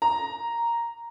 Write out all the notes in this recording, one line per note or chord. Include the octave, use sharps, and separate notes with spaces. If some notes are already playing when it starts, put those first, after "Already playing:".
A#5